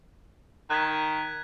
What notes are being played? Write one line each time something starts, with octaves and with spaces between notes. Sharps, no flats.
D#3 F#6 G#6 B6